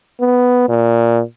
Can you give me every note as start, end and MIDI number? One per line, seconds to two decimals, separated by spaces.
0.20 0.68 59
0.69 1.22 46